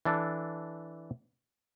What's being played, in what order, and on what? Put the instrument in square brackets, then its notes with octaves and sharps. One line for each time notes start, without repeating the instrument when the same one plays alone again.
[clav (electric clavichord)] E3 D4 A4